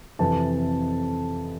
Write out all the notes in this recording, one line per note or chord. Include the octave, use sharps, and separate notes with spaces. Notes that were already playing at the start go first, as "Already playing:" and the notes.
F2 C3 E3 A5